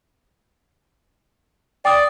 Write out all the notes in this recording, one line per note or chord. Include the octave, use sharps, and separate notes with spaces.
D5 G5 D#6